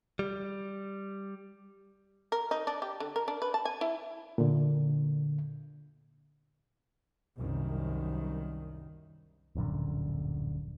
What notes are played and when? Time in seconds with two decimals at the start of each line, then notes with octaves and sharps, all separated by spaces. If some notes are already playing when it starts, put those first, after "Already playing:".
0.19 G3
2.32 A#4
2.51 D#4
2.67 D4
2.82 G4
3.00 D3
3.16 A#4
3.28 D4
3.42 B4
3.54 A5
3.65 G#5
3.81 E4
4.38 A#2 D3
7.37 C2 F#2 D#3
9.55 D1 A#1 F#2 D3